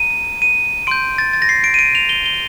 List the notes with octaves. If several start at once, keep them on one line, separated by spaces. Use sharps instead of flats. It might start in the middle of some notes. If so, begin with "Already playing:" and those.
Already playing: A#5 D#7
D#7
C6 G6 D7
A6
A6
A#6
C7
D7
D#7
D7
F7
G7
G7